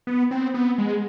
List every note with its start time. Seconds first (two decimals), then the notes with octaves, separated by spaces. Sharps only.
0.07 B3
0.31 C4
0.54 B3
0.78 G#3